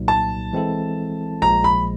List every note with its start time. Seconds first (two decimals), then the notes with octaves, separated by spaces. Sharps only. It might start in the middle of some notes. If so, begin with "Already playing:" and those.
Already playing: C2 A#2 F#3 A#3 D#4
0.08 A5
0.53 E3 G#3 C4 E4 A4
1.42 A#1 A#2 F3 G#3 A#5
1.64 B5